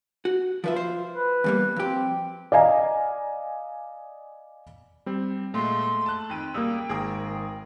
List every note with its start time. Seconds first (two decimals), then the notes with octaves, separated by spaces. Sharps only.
0.25 F#4
0.64 F3 F4 B4 E5
0.76 C5
1.13 B4
1.44 E2 G3 A#3
1.76 F2 C4 G4
2.52 D5 D#5 F5 G#5 A#5
5.06 G3 C4
5.54 A#2 G#3 A3 C6
6.06 A5 F#6
6.30 F2 D#3 G5 D#7
6.54 C#2 G3 A#3 D#6 E6
6.89 G#1 G#4 A#4 D#6